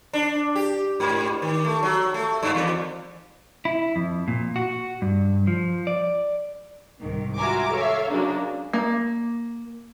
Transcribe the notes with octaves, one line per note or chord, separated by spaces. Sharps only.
D4
G4
G#2
D#3
A3
F#3
A3
G2
E2
E4
F2
A#2
F#4
G2
F3
D5
C2 G#2 D#3
F4 F#4 E5 G#5 A#5 D6
A4 C#5 E5 F5
C#3 F#3 G#3 A#3 D4 D#4
A#3